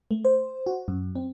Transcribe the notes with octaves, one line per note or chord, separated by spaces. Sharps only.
A3
C5
F#4
F#2
C4